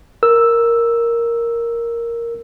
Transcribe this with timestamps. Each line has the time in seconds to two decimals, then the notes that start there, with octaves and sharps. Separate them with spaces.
0.23 A#4 E6